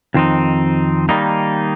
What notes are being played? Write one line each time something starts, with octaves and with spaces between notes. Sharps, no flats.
F2 D#3 C4 D#4
D#3 G3 A#3 D#4